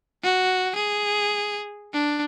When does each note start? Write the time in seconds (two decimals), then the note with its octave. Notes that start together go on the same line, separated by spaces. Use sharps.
0.23 F#4
0.75 G#4
1.93 D4